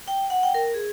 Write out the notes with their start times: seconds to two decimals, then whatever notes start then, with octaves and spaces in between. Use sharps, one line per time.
0.08 G5
0.30 F#5
0.43 G5
0.54 A#4
0.74 G#4